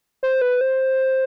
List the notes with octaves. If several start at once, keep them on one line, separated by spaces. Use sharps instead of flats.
C5
B4
C5